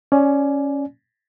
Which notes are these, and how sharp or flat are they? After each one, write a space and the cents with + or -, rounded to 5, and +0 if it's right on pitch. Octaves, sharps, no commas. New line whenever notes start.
C#4 +0 D5 +0 G#5 +20